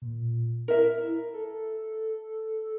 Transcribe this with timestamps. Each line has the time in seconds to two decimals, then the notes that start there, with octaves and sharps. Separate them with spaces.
0.02 A#2
0.68 E4 A#4 E5
1.34 A4